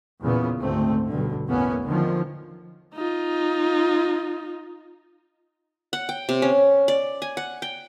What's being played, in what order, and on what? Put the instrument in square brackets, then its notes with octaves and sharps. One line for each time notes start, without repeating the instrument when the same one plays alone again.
[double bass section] E2 A#2 C#3 B3
D2 G#2 A3 C4
B1 G2 D3
A1 E2 A#3 B3 C#4
D3 D#3 F3
[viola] D#4 F4
[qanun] F#5
G5
C3
C#4
D5
G#5
F#5
G5